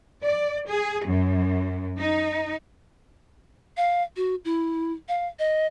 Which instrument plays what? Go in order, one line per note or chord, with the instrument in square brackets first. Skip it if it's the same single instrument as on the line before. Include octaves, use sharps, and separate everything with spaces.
[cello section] D5
G#4
F#2
D#4
[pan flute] F5
F#4
E4
F5
D#5